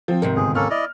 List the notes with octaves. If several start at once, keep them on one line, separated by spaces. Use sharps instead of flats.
F3 C4
D#2 G#2 C3 A#4
G1 G#4
A#3 C#4 A4 F6
E4 D5 D#5